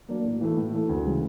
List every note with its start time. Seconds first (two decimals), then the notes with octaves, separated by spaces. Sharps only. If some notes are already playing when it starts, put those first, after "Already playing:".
0.08 F#3 A#3 D4
0.24 A2
0.41 E3 A3
0.57 A2
0.74 E3 A3
0.89 D2
1.06 C#3 E3 G#3